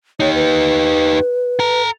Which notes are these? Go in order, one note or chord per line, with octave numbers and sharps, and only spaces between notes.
D#4 G4 C#5
B4
A4 A#5